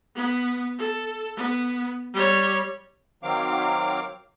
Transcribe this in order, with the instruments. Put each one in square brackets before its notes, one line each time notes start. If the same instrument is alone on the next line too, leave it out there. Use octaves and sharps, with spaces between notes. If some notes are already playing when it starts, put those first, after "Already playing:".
[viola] B3
A4
B3
G3 C#5
[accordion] D#3 F#3 C4 F5 D6